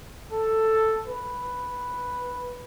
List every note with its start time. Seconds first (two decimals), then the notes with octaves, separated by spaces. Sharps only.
0.32 A4
1.07 B4